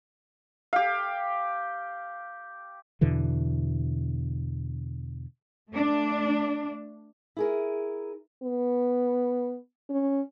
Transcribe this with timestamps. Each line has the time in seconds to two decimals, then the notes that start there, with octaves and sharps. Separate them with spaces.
0.73 G4 F5
3.01 E2 B2 D3 E3
5.69 A3 D4
7.37 E4 G#4 A#4
8.43 B3
9.90 C#4